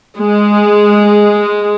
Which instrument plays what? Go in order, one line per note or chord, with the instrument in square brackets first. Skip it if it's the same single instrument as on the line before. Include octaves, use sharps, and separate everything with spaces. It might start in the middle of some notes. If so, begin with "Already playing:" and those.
[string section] G#3